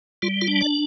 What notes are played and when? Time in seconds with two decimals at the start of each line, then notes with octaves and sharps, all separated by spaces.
0.22 G3 F4
0.41 F4
0.48 D4
0.61 D5